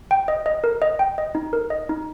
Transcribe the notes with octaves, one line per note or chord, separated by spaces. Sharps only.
G5
D#5
D#5
A#4
D#5
G5
D#5
D#4
A#4
D#5
D#4